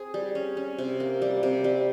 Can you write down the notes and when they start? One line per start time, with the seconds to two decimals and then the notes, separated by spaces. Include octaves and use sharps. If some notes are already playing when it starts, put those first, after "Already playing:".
Already playing: C4 G#4
0.14 G3
0.35 C#4
0.57 C#4
0.79 C3
1.00 A#3
1.22 G3
1.43 C3
1.64 G3